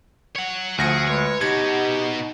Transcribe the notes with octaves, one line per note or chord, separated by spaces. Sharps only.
C#5 F#5
D2 F3 G#4 A#6 C#7
G#3 B4 C#5
B2 D#4 F#4 G4 G#6